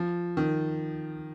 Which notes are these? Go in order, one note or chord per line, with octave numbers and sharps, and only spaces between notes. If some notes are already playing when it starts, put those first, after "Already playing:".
Already playing: F3
D#3